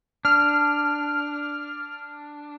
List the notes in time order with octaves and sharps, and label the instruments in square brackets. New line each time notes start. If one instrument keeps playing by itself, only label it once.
[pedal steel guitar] D4 [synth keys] F6